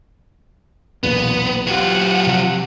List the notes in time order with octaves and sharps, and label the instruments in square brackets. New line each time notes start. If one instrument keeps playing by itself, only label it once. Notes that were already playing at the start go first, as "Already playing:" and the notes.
[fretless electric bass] B1 E2 A#2 [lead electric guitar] B3
[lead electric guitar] F#3 F4 [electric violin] G4 F#5
[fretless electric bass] C3 F3